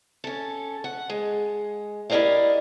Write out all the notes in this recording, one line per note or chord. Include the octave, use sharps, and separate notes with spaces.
C#4 A4
F#5
G#3
E4 G4 A#4 D5 D#5 F5